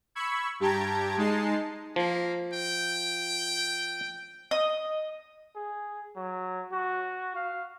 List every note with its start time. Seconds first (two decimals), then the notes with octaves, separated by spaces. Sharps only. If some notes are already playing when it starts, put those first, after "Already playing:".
0.15 B5 C#6 E6 G#6
0.60 G2 G4 A5 A#5 G#6 D7
1.17 G#3 D#4 A5 C7
1.96 F3 A#3
2.53 G5
4.51 D#5
5.56 G#4
6.16 F#3
6.72 F#4
7.36 F5